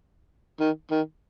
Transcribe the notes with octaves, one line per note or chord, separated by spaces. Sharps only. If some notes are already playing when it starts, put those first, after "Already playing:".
D#3
D#3